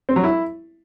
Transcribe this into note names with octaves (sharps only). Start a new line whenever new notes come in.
C4
F#3
E4